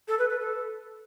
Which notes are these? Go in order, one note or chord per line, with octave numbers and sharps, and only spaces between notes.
A4
B4
B4
A4